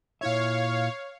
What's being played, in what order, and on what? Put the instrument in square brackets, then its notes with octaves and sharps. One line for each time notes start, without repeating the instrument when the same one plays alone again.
[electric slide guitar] A#2 E4 E5 [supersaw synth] C#5 F5